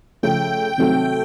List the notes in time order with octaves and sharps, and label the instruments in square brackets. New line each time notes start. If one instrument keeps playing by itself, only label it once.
[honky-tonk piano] C#3 F3 A3 C#4 [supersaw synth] G5
[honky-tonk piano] C3 D#3 F#3 A3 C4 [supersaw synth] G5